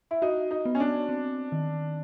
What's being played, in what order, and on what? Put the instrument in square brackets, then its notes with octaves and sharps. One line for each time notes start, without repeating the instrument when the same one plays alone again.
[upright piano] E4
[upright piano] D#4 [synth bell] F#4
[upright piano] D#4
[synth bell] B3
[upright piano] C#4
D4
[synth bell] C4
D#3